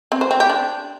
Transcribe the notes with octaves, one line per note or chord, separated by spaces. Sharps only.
C4
C5
C4
G4
D4